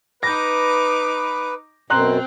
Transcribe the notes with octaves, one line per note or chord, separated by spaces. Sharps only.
D#4 B4 D6 G6 A#6
F#2 B2 C4 A#5 C6 F#6